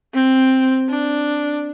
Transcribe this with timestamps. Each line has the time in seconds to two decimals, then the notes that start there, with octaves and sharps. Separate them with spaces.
0.13 C4
0.89 D4